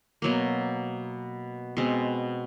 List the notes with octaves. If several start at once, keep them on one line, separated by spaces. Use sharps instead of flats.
B2 F#3 A#3
B2 G#3 C4